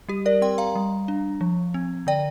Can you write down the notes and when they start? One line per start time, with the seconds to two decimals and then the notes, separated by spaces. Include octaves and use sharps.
0.09 G3 G4
0.26 A#4 D5
0.41 C4 G5 C6
0.58 F5 A#5
0.75 G3
1.08 D4
1.41 F3
1.74 C4
2.07 D3 D5 G5